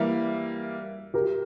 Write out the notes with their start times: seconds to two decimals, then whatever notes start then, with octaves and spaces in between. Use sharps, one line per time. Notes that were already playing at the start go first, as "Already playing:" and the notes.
Already playing: E3 G3 A#3 E5
1.14 G4 A#4